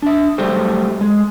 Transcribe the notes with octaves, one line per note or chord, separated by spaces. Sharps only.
D4 E5
F#3 G3 A3 G4 C5
G#3